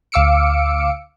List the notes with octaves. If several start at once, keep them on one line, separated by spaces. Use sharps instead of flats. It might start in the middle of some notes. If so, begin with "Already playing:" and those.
D2 F5 D6 E6 C#7 D7